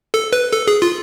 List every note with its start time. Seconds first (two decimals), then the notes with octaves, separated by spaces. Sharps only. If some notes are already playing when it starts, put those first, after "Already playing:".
0.14 A4
0.33 B4
0.52 A4
0.67 G#4
0.82 F4